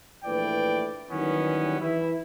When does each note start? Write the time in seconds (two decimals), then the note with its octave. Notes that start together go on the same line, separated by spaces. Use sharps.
0.25 A#1 E3 A3 B4 D5 G5
1.11 D#3 E3 F#3 G3 B3 C#4
1.81 E3 E4